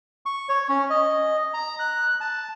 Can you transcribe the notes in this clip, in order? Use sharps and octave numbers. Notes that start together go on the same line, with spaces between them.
C#6
C#5
C#4
D#5
A#5
F#6
A5